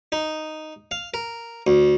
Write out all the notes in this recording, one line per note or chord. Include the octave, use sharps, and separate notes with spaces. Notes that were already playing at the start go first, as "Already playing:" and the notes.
D#4
F5
A#4
D2